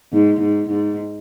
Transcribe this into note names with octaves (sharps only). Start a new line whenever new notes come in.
G#2
G#2
G#2